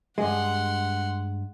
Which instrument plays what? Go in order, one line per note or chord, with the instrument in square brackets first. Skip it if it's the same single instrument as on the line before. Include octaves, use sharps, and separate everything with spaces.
[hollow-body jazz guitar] G2 G#3 [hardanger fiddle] F#5 C6